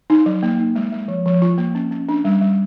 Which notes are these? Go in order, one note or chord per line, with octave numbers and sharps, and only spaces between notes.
D#4
F#3
A#3
D#4
G#3
G#3
F3
F3
F4
A#3
C#4
C#4
D4
G3
G3